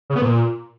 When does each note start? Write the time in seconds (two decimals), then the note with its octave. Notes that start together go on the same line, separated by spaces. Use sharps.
0.10 C#3
0.16 B3
0.22 A#2